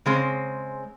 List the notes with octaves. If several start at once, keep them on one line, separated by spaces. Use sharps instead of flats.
C#3 G#3 C4